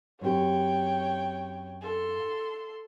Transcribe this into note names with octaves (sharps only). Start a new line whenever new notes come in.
F#2 C4 G4 C#5 G5
A4 C6